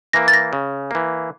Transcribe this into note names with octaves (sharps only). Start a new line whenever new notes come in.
E3 A#3 A#6
A6
A#6
C#3
E3 A#3